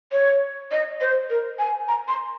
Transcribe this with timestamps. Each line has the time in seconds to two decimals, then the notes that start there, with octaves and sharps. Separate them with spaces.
0.12 C#5
0.71 D#5
1.01 C5
1.30 A#4
1.59 G#5
1.88 A#5
2.08 C6